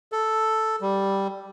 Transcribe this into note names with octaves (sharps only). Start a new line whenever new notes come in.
A4
G3